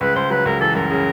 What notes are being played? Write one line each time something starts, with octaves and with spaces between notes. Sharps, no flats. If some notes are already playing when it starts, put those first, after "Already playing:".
C#2 B4
C#2 C5
F#3 B4
C#2 A#4
E3 A4
F#2 A#4
C#3